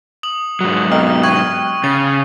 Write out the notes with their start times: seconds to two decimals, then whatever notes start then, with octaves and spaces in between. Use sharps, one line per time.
0.23 D#6 F#7
0.61 G#2 F#3
0.91 B3 D#5 G5 F6
1.23 G5 C#6 F#6 G#6
1.84 C#3 A6